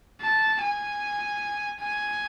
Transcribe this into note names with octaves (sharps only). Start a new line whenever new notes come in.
A5
G#5
G#5